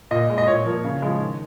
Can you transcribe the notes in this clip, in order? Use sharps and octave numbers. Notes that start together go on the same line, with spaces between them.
A#2 D#5
G#3
D#5
A#2 C#5
F3 A#3
C#3
F3 G#3
D#3